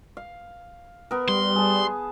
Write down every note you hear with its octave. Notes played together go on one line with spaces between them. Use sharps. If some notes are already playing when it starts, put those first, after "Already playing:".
F5
B3 A#4
G3 C6
G#4 A5